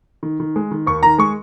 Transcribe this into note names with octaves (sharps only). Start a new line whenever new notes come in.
D#3
D#3
G#3
D#3
D#2 C#6
D#3 A#5
G#3 C#6